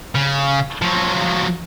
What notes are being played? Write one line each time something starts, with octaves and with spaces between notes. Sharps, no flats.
C#3
F3 F#3